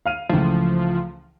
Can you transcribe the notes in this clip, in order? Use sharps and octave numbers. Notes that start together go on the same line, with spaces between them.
F5 F6 D#7
C#2 E3 F3 A3